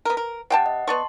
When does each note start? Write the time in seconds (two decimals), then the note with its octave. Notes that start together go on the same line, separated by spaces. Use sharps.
0.05 B3 A#4
0.17 A#4
0.50 C3 F#5 G5 A5
0.66 D#5
0.87 B3 D5 A5 C6 C#6